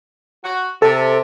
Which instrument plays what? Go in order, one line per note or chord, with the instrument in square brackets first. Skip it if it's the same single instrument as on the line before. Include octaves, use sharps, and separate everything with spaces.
[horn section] F#4
[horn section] C3 [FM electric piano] A4 A5